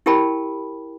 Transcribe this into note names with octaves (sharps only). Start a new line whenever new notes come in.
E4 G4 A#4 G5 A5 B5